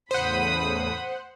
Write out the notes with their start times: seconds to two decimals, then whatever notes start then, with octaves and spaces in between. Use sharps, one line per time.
0.11 E2 A2 C#3 C5 F#5 B5 D#6